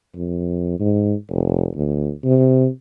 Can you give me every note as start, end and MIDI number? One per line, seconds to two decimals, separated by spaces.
0.15 0.77 41
0.79 1.14 44
1.29 1.69 29
1.75 2.11 38
2.24 2.68 48